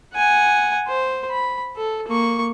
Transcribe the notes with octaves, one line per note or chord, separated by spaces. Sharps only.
F#5 G#5
C5
B5
A4
A#3 C#6